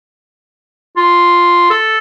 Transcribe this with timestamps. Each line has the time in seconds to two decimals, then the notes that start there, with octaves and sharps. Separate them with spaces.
0.97 F4
1.70 A4